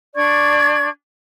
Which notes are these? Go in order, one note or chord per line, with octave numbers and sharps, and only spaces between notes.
D4 D5 C#6 G#6